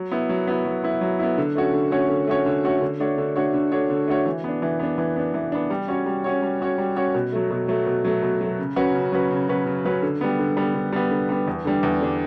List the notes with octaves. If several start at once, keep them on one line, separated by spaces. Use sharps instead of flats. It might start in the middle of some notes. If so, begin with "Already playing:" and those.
Already playing: F#3
B3 E4
F#3
B3 E4
F#3
B3 E4
F#3
B3 E4
D3
A3 C#4 F#4 C#5
D3
A3 C#4 F#4 C#5
D3
A3 C#4 F#4 C#5
D3
A3 C#4 F#4 C#5
D3
A3 D4 F#4 C#5
D3
A3 D4 F#4 C#5
D3
A3 D4 F#4 C#5
D3
A3 D4 F#4 C#5
E3
B3 D4
E3
B3 D4
E3
B3 D4
E3
B3 D4
G3
C#4 F#4 C#5
G3
C#4 F#4 C#5
G3
C#4 F#4 C#5
G3
C#4 F#4 C#5
B2
F#3 A3
B2
F#3 A3
B2
F#3 A3
B2
F#3 A3
C#3
F#3 C#4 F#4 B4
C#3
F#3 C#4 F#4 B4
C#3
F#3 C#4 F#4 B4
C#3
F#3 C#4 F#4 B4
D3
G3 B3
D3
G3 B3
D3
G3 B3
D3
G3 B3
E2
D3 G3 D4
E2
D3 G3 D4